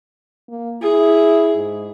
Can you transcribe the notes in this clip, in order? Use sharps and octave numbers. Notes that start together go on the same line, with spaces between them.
A#3
E4 G#4
G#2